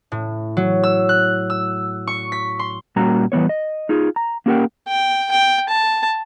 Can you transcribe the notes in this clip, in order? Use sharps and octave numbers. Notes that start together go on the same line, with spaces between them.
A2
F#3
E6
F#6
E6
C#6
B6
C6
A#2 G3 A#3 C#4 F#4 A#5
E3 G3 B3 C#5
D#5
D#4 F4 G#4
A#5
A#3 C#4 G4 A#4 F#5 G5
G5
G5
A5